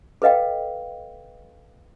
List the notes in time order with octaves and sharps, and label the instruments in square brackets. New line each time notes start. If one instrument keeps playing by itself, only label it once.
[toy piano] A4 B4 D#5 F5 G5